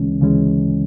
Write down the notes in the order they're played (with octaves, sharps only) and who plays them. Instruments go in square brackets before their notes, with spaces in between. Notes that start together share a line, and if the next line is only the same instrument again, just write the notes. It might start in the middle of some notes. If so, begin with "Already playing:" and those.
Already playing: [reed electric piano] D2 C#3 E3 G#3 C#4
D2 C#3 E3 G#3 C#4